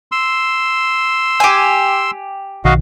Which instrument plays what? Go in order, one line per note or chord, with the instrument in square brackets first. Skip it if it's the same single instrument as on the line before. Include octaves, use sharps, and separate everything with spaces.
[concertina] C6 E6
[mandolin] G4 G#5
[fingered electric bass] B1 D#3 [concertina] F#4 D#5 F5